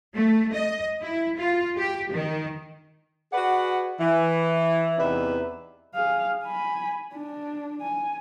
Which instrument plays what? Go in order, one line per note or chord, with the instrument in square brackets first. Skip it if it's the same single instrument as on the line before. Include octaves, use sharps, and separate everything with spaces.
[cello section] A3
D#5
E4
F4
G4
D#3
[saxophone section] F#4 G#4 B4 D5 F#5
E3
E2 C3 D#4 B4 D5 E5
[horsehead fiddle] G#4 F5
G#5 B5
D4
G#5